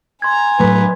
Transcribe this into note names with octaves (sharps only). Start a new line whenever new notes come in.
G#5 A#5 C6 G#6
A2 F#3 B4